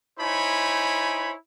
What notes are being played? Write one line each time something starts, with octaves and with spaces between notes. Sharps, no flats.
D#4 E4 C5 C#5 G#5 B5